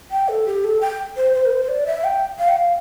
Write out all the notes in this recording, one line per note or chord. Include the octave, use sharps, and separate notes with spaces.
G5
A4
G4
A4
G5
C5
C5
A#4
C5
C5
D5
E5
G5
F5
G5
F5